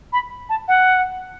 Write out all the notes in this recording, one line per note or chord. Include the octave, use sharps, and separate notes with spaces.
B5
A5
F#5